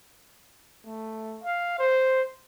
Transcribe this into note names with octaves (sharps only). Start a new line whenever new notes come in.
A3
F5
C5